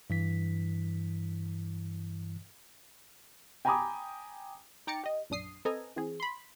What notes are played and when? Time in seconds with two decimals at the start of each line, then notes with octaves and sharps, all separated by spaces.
0.10 G2 E3 B6
3.65 G5 G#5 A#5 B5 D6 D#6
4.87 D#4 G5 A#5 D6 A6 C#7
5.04 G4 D#5
5.30 A#1 F#2 D4 D#6 C7
5.65 C4 A4 B4 D#5 G#5 A#5
5.96 E3 C4 G#4
6.20 B5 C6